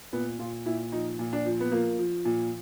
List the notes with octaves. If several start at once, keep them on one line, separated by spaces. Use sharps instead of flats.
A#2 B3
A#2 F4
A#2 E4
F3 D#4
A#2
D4
F3
B3
F3 A#3
F3
A#2